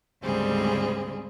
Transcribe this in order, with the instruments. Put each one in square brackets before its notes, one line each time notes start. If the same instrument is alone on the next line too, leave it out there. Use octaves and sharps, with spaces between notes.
[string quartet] D2 G#2 C#3 G3 C4 G#4